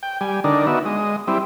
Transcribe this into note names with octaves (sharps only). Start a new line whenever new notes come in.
G5
G3 G#5
D3 D4 D#4 A#4
B3 D#4 F#4 E5
G#3 D#5
G3 C4 E4